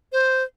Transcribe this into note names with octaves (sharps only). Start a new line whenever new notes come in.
C5